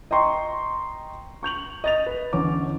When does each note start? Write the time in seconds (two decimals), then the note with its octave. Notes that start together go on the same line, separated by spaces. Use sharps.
0.11 D#5 G5 A#5 C6 C#6
1.43 C#6 G6 F7 F#7
1.84 D#5 A6 F7
2.06 B4
2.33 E2 D3 C#4 D6